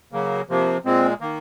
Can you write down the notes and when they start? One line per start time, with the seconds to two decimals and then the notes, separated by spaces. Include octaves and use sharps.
0.12 C#3 F#3 A#3
0.49 C3 F3 A#3
0.85 A#2 G#3 C4
1.21 D#3 A#3